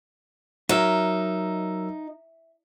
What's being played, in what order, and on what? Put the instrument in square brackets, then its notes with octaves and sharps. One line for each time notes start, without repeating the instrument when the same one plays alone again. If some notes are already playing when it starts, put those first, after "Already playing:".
[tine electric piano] F#3 A#4 E6 [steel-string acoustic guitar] D#4 [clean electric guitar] E5